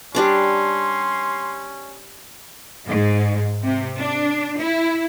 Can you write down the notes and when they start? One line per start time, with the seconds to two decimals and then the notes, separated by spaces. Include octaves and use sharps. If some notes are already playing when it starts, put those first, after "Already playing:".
0.15 G3 C#4 D4 C6 D6
2.86 G#2
3.64 C3
3.99 D4
4.59 E4